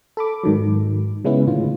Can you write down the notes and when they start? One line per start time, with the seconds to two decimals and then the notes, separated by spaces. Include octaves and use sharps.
0.17 A4 B5 D6
0.44 G#2 D#3 F#3
1.25 C#3 G#3 B3 C#4 E4 B4
1.47 A2 D3 D#3 F4